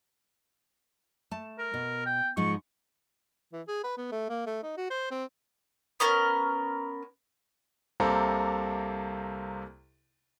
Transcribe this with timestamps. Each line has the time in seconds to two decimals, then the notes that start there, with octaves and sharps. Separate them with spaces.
1.31 A3 A5
1.59 A#4
1.74 B2
2.06 G5
2.37 G#2 F3 G#3 C#6
3.53 E3
3.68 G#4
3.84 B4
3.97 B3
4.12 A3
4.29 A#3
4.47 A3
4.63 D#4
4.77 F#4
4.91 C5
5.11 C4
6.00 B3 C#4 A#4
8.00 C2 C3 A#3 A4 C5 A#5